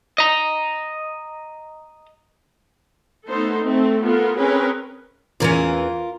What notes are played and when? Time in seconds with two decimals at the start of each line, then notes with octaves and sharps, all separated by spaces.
0.18 D#5 A#5
3.26 A3 B3 D#4 A4 C5
3.62 A3 C4
4.02 B3 F4 A4 A#4
4.38 C4 C#4 G#4 A#4 B4
5.40 E2 E3 C#4 F4 A#4